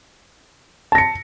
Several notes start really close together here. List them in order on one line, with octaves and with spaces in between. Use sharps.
A5 A#6 C#7